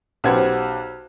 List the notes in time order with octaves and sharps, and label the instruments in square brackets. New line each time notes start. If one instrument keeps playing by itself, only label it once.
[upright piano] B1 G4 B4 C5 F#5 G#6